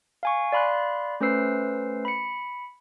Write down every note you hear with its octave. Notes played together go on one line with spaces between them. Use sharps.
F5 G#5 C#6
D5 F5 B5 C6 F#6
A3 C#4 B4 C5 E6 C7
B5 C#7